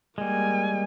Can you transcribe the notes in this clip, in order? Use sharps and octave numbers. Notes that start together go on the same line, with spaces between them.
G3 G#3 A#3 G#5